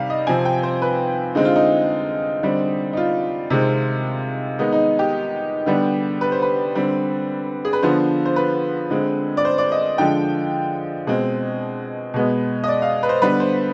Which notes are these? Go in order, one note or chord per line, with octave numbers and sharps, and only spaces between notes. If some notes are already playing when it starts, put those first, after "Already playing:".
Already playing: C3 D#3 G3 F5
D#5
C3 F3 C4 G#5
G5
C5
B4
D3 G#3 C4 D#4
F4
D#4
D3 G3 C4
D#4
F4
C3 D#3 G#3 C4
D#3 G#3 B3 D#4
D#4
G4
D3 G3 B3
B4
C5
B4
D3 G3 C4
G#4
B4
D3 F3 B3 C5
C5
B4
D3 G#3 C4
D5
C5
D5
D#5
D3 F3 G#3 G5
B2 G#3 C4
B2 G#3 B3
D#5
D5
F5
B4
C5
D3 G3 B3 B4
C5